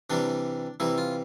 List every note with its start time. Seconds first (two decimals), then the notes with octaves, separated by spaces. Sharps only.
0.10 C3 E3 G3 D4
0.80 C3 E3 G3 E4
0.98 F4